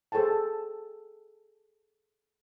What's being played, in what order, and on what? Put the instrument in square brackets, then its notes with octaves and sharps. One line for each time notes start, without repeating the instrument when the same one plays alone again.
[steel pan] G#4 A4 C5 G5 A5